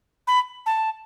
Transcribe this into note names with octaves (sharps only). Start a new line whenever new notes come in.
B5
A5